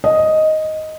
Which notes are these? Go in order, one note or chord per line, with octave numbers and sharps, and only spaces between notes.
D#5